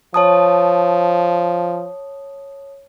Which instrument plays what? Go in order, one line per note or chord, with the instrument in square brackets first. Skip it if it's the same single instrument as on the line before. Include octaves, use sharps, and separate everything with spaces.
[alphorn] F3 [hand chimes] C#5 A5 D#6